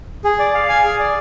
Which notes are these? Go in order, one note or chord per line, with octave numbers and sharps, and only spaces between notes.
G#4
D5
F5
G#5
G#4
D5